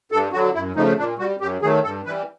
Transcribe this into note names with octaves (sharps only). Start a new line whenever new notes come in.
G2 A4
D3 F#3 F#4
F#2 E4
C#3 F3 A3 D#4
A#2 D4
G3 F#4
F#2 G4
D#3 F#3 A3 G#4
G2 A4
E3 G3 B4